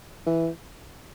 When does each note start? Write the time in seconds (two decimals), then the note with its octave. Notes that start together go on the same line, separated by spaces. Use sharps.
0.26 E3